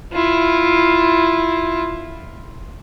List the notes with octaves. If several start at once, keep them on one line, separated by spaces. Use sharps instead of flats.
E4 F4